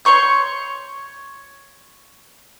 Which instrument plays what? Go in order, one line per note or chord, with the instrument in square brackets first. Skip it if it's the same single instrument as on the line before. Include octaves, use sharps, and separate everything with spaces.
[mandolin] C#5 C6 C#6 G6